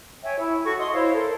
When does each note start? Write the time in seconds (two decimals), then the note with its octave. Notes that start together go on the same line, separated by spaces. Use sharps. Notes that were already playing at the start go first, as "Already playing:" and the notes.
0.24 C#5 E5 G5 G#5
0.38 E4
0.64 F#4 A4 C#6
0.78 D#5 C6 D#6
0.94 E4 C5 C#5 F5
1.14 A4 A#4